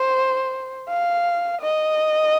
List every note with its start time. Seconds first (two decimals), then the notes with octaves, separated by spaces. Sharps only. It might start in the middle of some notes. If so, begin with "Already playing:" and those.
Already playing: C5
0.89 F5
1.61 D#5